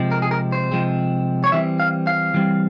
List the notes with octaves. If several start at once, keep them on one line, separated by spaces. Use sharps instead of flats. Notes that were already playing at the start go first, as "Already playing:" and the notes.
Already playing: C3 F3 G#3 C4
A#4
G#4
A#4
C5
C3 F3 G#3 C4
C#5
E3 G3 C4 E5
F5
F5
E3 G3 C4